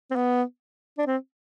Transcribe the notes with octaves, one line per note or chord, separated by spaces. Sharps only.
C4
B3
D4
C4